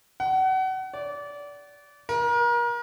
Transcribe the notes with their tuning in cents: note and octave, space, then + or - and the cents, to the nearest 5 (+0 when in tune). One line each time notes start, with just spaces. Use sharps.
F#5 +30
D5 -25
A#4 +35